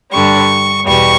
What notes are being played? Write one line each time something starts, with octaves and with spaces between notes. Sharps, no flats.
G2 D3 G3 C#6
E2 B2 G3 C#6